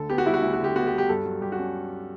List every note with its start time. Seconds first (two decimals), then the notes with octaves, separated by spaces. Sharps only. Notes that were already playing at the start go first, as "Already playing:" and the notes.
Already playing: D2 D3 A4
0.09 B3 G4
0.18 F#4
0.25 G3 E4
0.34 F#4
0.42 D2 E4
0.53 F#4
0.59 D3
0.64 G4
0.76 B3 F#4
0.87 G4
0.93 G3
0.98 G4
1.09 G2 A4
1.25 F#3
1.41 G2 G4
1.52 F#4
1.59 C#4